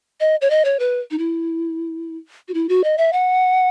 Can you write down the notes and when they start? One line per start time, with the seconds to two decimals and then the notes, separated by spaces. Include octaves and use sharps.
0.20 D#5
0.41 C#5
0.50 D#5
0.65 C#5
0.79 B4
1.11 D#4
1.18 E4
2.48 F#4
2.54 E4
2.69 F#4
2.84 D#5
2.98 E5
3.13 F#5